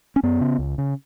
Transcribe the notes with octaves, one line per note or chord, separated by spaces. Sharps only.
C#4
F#2 B3
C#3
C#2
C#3